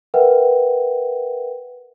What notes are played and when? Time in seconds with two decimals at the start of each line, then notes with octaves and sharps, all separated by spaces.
0.14 A#4 B4 E5 F#5 G5